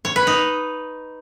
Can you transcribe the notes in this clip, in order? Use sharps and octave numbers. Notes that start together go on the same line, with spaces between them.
C#5
B4
D#4